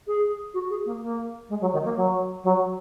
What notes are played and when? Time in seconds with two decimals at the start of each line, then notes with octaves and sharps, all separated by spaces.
0.07 G#4
0.53 F#4
0.70 G#4
0.85 A#3
1.02 A#3
1.49 G#3
1.60 F#3
1.72 D#3
1.84 A#3
1.96 F#3
2.43 F#3